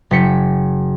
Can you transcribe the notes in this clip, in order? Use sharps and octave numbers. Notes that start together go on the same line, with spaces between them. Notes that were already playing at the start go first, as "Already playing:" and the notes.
F#1 G5 B6 C#7